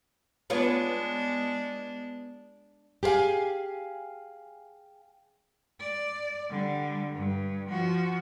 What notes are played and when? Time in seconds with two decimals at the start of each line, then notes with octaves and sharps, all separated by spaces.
0.50 G#3 B3 D4 F4 C#5
3.03 G4 G#4 B4 F5 G#5
5.80 D5
6.50 D3 G3
7.14 G2
7.70 F3 F#4